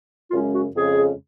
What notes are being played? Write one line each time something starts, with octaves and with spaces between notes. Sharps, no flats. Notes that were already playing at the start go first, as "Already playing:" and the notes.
F#2 C#3 G#3 C#4 F4
F#4
F2 C#3 G#3 G#4